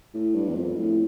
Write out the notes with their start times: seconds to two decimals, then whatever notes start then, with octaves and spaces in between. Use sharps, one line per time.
0.14 A2
0.35 G2
0.48 E2
0.56 F2
0.77 A2